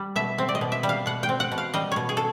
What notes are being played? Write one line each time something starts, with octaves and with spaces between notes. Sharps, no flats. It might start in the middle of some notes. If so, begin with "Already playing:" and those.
Already playing: G3
B2 E5
C4
D5
D#5
B2
E5
G3
F5
B2 F#5
G5
C4
F#5
B2
F5
G3 D#5
B2 C#5
G#4
A4